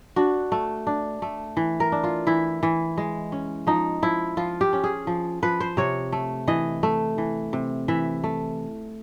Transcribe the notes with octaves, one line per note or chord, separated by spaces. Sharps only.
D4 F#4
A3
D4
A3
E3
A#4
D4
F4
E3 E4
E3
G#3
C#4
F3 D#4
F3 E4
F3 F4
G4
C#4
G#4
F3
F3 B4
C5
C3 C#5
A3
E3 D#5
A3
E3
C3
E3 E5
A3